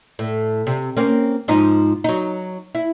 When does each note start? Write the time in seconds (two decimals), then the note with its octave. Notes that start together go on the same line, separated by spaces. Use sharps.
0.19 A2
0.67 C3
0.97 A#3 C4 C#4
1.48 G#2 F3 D#4
2.04 F#3 D#4
2.75 E4